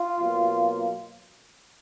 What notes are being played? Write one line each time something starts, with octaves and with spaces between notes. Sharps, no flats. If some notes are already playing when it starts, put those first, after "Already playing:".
Already playing: F4
B2 F#3 A#3